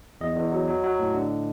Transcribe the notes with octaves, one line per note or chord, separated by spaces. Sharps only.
E2 D#5
E2
F#3
F#3
F#3
A2
D3